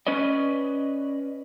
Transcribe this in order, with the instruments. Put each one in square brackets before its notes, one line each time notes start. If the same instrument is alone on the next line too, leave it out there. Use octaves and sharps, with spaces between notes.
[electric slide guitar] C#4 B4 D5 D#5